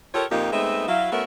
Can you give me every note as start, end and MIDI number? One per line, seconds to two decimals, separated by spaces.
0.14 0.24 65
0.14 0.24 67
0.14 0.24 69
0.14 0.24 70
0.14 0.24 73
0.30 0.50 41
0.30 0.50 46
0.30 0.50 58
0.30 0.50 63
0.30 0.50 65
0.30 0.50 67
0.52 0.86 56
0.52 0.86 57
0.52 0.86 59
0.52 0.86 60
0.52 0.86 63
0.52 0.86 76
0.88 1.10 54
0.88 1.10 64
0.88 1.10 77
1.12 1.24 57
1.12 1.24 59
1.12 1.24 61
1.12 1.24 66
1.12 1.24 70
1.12 1.24 76